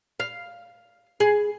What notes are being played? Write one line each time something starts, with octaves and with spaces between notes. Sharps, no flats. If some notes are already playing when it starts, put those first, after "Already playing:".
F5
G#4